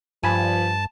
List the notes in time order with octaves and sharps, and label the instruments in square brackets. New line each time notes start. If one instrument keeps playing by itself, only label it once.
[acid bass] G2 [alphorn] F3 [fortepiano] G#5 B5 [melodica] A5